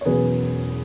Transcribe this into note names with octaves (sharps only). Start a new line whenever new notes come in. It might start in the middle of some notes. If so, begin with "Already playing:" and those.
C#5
E1 E2 C#3 F#3 G#4 B4